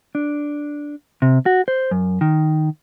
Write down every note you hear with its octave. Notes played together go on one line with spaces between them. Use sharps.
D4
C3
F#4
C5
F#2
D#3